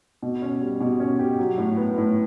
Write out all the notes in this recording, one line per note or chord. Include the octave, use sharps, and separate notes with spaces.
B2
C#4
G3
B2
C#4
G4
F#3
A2
B3
A2